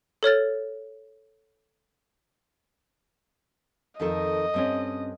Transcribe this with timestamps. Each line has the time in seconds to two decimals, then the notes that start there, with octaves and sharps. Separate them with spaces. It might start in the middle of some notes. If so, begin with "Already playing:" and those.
0.23 A4 C#5 F6 A6
4.00 F2 D#3 A4 D#5
4.54 G2 C4 C#4